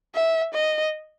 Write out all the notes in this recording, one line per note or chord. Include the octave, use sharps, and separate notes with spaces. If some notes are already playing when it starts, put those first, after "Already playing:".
E5
D#5